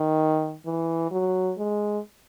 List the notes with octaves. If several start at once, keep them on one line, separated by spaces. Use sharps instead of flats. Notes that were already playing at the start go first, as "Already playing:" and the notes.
Already playing: D#3
E3
F#3
G#3